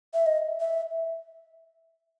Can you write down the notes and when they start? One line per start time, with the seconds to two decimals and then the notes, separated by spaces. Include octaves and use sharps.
0.14 E5
0.26 D#5
0.60 E5